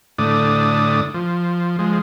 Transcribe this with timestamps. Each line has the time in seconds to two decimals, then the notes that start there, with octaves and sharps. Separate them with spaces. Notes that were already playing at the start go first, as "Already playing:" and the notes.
0.18 A2 D3 D5 D#6
1.14 F3
1.79 F3 G#3